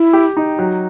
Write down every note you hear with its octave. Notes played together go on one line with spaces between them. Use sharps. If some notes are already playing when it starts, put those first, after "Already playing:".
Already playing: E4
G4
D#4
F#3